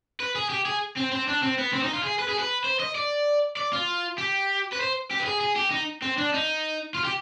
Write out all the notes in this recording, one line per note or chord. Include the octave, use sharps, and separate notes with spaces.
B4
G#4
G4
G#4
C4
C4
D4
C4
B3
C4
D#4
F4
G#4
B4
G#4
B4
C5
D#5
D5
D5
F4
G4
B4
C5
G4
B4
G#4
G#4
G4
D#4
C4
D4
D#4
F4
G4